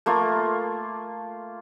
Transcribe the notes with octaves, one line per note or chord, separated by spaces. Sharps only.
A3 A#3 F4